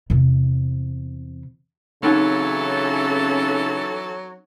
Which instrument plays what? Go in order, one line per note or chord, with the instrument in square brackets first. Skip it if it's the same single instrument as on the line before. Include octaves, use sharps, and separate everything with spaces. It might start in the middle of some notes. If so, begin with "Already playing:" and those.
[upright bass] E2 C3
[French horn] C#3 [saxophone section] E3 A4 [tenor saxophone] F#3 [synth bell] C4 C#4 D#4